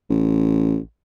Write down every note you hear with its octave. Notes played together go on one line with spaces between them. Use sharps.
A1